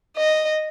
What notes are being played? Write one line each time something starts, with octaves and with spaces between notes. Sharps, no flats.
D#5